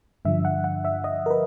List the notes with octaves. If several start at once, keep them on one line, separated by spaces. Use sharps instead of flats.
G2 D3 F3 E5
F#5
F#5
E5
D#5
A#4
B4